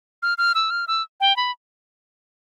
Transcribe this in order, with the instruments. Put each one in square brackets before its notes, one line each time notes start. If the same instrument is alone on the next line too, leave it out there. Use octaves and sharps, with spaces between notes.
[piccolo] F6
F6
E6
F6
E6
G5
B5